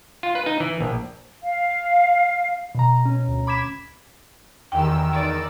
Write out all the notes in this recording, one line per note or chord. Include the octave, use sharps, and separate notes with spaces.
F4
B4
D#4
E3
A#1
F5
B2 A#5
C#4
D2
B5 D6 G#6 B6 E7
E2 D#3 G4 G5 E6
D#4 D5